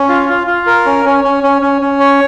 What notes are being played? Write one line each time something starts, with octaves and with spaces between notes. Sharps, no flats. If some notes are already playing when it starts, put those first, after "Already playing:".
Already playing: C#4
F4
F4
F4
A#4
C#4
C#4
C#4
C#4
C#4
C#4
C#5